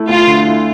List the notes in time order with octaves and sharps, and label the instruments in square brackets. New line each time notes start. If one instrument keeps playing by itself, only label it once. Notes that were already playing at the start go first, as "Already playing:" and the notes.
Already playing: [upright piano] A3 E4
[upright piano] D2 [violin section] F4
[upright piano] D3
E4